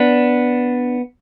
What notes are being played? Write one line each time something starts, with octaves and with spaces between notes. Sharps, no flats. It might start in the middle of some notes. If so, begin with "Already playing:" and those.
Already playing: B3 D4